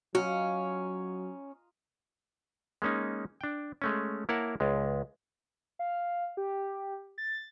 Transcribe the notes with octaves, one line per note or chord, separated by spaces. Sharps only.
F#3 C#4 F4 F#4 D#5 A#5
G#3 A#3 C#4 D#4
D4 G5
G#3 A3 C#4
A#3 E4 A#4 C#5 F#5 A5
C#2 G#3
F5
G4
A6